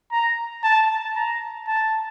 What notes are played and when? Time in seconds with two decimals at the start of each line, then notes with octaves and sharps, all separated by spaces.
0.12 A#5
0.64 A5
1.16 A#5
1.68 A5